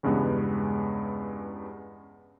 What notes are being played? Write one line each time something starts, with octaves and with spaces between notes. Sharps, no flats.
E2 G2 C#3 G#3 B3